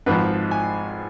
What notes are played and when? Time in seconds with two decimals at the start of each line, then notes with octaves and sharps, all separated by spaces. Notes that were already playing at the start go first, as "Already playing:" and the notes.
0.06 G#1 G#2 F3 B4
0.51 G#5